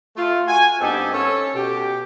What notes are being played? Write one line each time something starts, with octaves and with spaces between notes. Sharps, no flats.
A3 F4
F#4 G#5
G2 B3 C4 D#4 G4 A4
C#4 A4
B2 G4